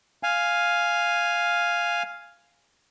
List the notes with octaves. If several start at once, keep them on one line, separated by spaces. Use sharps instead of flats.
F5 G#5